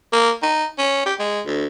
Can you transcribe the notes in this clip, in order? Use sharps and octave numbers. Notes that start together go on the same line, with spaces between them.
A#3
D#4
C#4
G4
G#3
D2